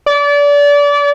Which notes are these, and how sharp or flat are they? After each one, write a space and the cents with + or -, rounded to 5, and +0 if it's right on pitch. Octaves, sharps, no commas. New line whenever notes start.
D5 -30